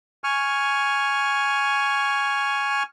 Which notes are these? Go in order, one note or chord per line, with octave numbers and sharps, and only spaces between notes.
G#5 C#6 F6